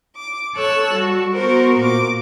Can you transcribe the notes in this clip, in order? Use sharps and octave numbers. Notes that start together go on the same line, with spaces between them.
D6
A4 C#5 A5 E6 F#6
G3 F#4
B3 F#4 A#4 C5
A#2 D6